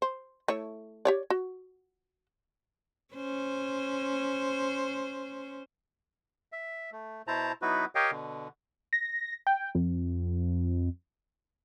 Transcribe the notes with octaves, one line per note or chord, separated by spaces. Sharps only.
C5
A3 E4 C#5
G4 C#5 D5
F#4
C#4 C5
E5
A3
B2 E4 C5 A5 A#5
F#3 B3 D#4 E4 F#4 B4
G4 A#4 C#5 D#5 F5 G5
B2 D3
A#6
G5
F2